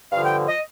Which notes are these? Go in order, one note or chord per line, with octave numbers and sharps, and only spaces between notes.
G2 D3 F3 F5
G5
D#5